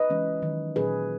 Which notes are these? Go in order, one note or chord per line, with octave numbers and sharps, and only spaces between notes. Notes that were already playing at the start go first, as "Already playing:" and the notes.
Already playing: B4 D#5
E3 G#3 C#4
D#3 F#3 C#4
A#2 F#3 C#4 G#4 B4